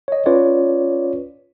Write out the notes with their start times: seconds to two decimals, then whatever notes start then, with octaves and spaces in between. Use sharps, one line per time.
0.08 C#5 D#5
0.26 C#4 F4 B4 C#5 D5